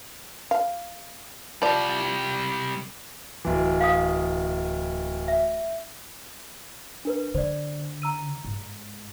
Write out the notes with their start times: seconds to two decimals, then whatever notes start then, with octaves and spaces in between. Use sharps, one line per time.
0.51 F5
1.62 C3 F3 G3 D5
3.45 D1 E3
3.81 F5 F#5 D#6
5.28 E5
7.05 D4 A#4 B4
7.35 D3 C5 D5
8.02 A#5 E6 D#7
8.45 G#2